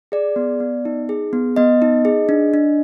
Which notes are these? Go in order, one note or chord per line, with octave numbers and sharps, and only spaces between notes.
G#4 D5
B3
B3
D#4
G#4
B3
B3 D#5
D#4
G#4
D4
D4